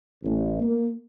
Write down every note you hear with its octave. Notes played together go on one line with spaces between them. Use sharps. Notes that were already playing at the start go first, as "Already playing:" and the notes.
A1
A#3